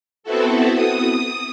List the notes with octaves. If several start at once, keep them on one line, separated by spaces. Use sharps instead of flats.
B3 C4 E4 F#4 A4
D#6